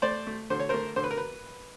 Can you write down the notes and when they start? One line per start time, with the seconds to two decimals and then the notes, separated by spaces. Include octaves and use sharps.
0.02 A3 C5 D5
0.27 A3
0.50 D3 C5
0.60 C#5
0.69 A3 A#4 C5
0.96 D3 C5
1.04 B4
1.11 A#4
1.17 B4